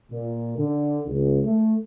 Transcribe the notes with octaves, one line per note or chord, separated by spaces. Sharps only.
A#2
D3
C#2
A3